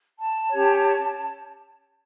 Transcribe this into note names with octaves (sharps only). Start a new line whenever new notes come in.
A5
C#4 G4 C#5